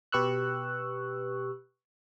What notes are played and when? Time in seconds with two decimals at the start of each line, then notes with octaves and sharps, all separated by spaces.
0.12 B2 G4 B4 C#6 E6 F#6